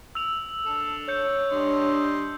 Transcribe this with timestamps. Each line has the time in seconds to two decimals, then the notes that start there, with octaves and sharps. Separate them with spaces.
0.15 E6 F7
0.66 D4 A4
1.09 C#5 G6 C#7
1.52 G3 D4 D#5 C6